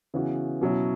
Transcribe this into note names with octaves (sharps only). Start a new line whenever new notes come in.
C#3 E3 B3 F#4
B2 F#3 C#4 E4